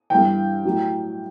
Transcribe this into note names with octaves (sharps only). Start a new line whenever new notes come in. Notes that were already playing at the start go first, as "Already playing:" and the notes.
G2 E3 G5
A2 F#3